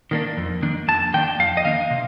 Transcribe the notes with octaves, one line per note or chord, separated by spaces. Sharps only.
D#3 A#3 D4
F2
D#3 A#3 D4
F2 A5
D#3 A#3 D4 G5
F2 F5
D#5
D#3 A#3 D4 F5
C3